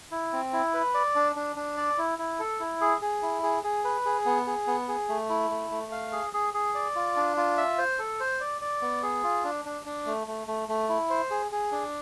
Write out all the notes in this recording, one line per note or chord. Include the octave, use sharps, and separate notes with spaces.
E4
C4
E4
B4
D5
D4
D4
D4
D5
E4
E4
A4
E4
G#4
G#4
E4
G#4
G#4
B4
G#4
B3
G#4
B3
G#4
A3
E4
A3
A3
F5
G#4
G#4
G#4
D5
F4
D4
F4
E5
C5
A4
C5
D5
D5
B3
G#4
F4
D4
D4
D4
A3
A3
A3
A3
E4
C5
G#4
G#4
D4